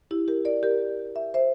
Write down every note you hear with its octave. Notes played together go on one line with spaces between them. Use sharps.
E4 G4
G4 A#4
A#4 D5
G4 A#4
E5
C5 E5